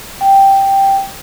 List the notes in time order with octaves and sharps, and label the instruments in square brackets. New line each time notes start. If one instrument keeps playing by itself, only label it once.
[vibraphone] G5